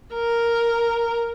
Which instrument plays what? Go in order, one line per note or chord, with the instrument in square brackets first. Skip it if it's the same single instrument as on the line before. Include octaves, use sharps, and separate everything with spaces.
[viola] A#4